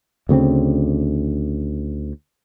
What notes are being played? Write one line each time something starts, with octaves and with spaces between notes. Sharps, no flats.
D2 C#3 A#3 C4